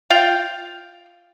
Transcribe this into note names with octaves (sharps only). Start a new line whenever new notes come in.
F4 F5 G5